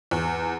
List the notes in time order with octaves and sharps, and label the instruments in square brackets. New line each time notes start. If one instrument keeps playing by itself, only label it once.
[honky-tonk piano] E2